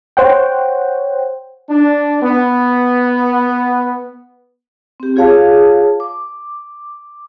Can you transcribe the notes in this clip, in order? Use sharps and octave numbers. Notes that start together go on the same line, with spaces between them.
C5 C#5 F#5 G5
D4
B3
C4 G4
F4 G#4 C#5 F5 A5
D6